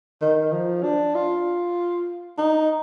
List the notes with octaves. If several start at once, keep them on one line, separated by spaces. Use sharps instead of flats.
D#3
F3
D4
F4
D#4